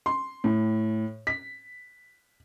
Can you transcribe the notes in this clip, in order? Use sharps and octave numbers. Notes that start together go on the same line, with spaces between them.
C6
A2
B6